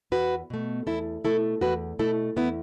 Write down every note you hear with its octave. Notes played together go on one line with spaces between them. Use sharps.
E2 F#4 B4
B2 A3
E2 E4 A4
B2 A3 E4 A4
E2 F#4 B4
B2 A3 E4 A4
E2 B3 E4